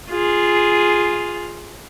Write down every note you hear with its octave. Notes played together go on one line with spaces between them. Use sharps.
F4 G#4